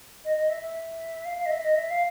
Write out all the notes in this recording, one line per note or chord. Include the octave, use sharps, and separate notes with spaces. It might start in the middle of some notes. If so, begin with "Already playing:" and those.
D#5
D#5
E5
E5
F5
F5
D#5
E5
D#5
E5
F5